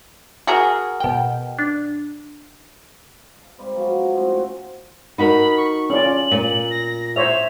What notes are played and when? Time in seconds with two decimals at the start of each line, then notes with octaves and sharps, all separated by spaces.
0.47 F#4 G#4 A#4
1.00 B2 G5
1.59 D4
3.43 A5
3.58 G#2 C3 G3 C5
3.75 B2 F3 F#3 C#4
3.89 A#2
4.12 A2 G#3 C4
4.28 F#4 G5
5.18 D#4 F#4 A#4 B5
5.57 C#6
5.90 C#4 F4 D5 F#7
6.31 A#2
6.71 A#6
7.16 C5 C#5 E5 F7